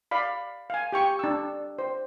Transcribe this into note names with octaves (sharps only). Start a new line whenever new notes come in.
D5 F5 B5
F5 G#5
G4 G5 C#6
D4 E6
C5